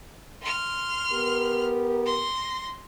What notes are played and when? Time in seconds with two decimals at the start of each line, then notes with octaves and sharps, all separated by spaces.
0.41 C6 F6
1.12 B3 G4 A#4
2.05 C6 A#6